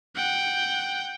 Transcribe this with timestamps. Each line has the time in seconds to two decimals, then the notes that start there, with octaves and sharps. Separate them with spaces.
0.16 F#5 G5